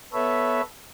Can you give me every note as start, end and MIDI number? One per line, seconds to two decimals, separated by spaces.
0.13 0.61 59
0.13 0.61 69
0.13 0.61 71
0.13 0.61 73
0.13 0.61 76